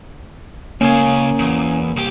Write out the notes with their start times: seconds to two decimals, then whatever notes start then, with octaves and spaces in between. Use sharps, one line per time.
0.81 C#2 C#3 A#3 C#4 G#5
1.39 E2
1.96 C2 G4